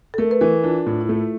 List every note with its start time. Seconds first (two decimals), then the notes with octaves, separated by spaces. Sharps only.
0.14 A4
0.18 A3 A#4
0.31 B4
0.41 E3 A#4
0.64 D4 F4
0.86 A2 F4
1.01 E4
1.09 A3 F4